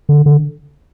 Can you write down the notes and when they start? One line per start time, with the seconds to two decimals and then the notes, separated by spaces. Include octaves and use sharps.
0.09 D3
0.26 D3